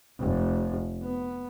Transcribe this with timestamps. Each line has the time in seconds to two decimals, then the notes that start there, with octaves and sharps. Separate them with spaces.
0.19 F1
1.03 B3